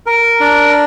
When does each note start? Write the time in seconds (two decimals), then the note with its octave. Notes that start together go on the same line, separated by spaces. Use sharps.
0.06 A#4
0.40 D4